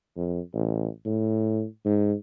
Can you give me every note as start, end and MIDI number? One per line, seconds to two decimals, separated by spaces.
0.17 0.40 41
0.54 0.88 33
1.06 1.65 45
1.85 2.14 44